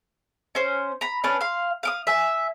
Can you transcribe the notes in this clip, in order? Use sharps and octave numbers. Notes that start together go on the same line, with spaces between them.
C#4 C5
A#5 B5
C#4 D4 B4
F5 C6
F5 D6 D#6
E5 G#5